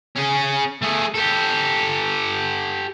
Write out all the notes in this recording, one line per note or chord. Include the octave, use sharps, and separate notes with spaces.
C#4 G#4
A3 G#4
G4 A4